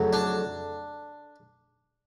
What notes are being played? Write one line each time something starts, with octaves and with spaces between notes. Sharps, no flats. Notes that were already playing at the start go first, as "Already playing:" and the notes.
Already playing: F2 C#3 F#3 A3
D4